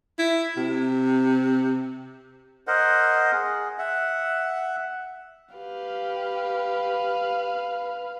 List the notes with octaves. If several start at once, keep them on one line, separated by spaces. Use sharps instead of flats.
E4
C3
A#4 C5 D#5 F#5
G#4
E5 F#5
G4 B4 F5